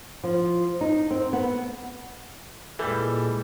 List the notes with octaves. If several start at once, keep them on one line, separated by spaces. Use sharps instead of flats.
F3
D#4
C4
B3
A#2 E3 G3 G#3 A4 G6